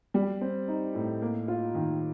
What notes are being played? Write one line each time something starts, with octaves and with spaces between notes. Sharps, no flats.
G3
C4
D#4
A2
A#3
F4
D#3